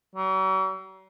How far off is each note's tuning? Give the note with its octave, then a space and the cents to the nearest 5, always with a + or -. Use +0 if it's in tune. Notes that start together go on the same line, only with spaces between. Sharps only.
F#3 +45